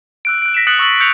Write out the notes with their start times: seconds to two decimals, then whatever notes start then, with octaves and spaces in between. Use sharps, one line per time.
0.25 E6 F#6 D7
0.42 F#6 D7
0.54 A#6 B6 D7 E7
0.67 D#6 F#6 A6 C#7 F#7
0.79 C#6 E6 A6 F#7
1.00 C#6 E6 G6 A#6 C#7 F7